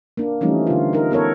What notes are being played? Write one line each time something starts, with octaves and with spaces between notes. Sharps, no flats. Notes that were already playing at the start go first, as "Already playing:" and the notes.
A#3 D4
E3 F3 G3 A3 C#4 D#4
D3 F4
D#4 F4 A#4
B3 A4 A#4 C#5